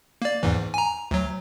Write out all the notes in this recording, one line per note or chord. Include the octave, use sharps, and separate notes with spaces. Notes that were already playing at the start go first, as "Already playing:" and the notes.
A#3 D5
E2 G#2 E3
G#5 A#5
D2 F#3